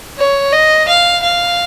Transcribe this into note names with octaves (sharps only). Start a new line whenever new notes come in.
C#5
D#5
F5
F5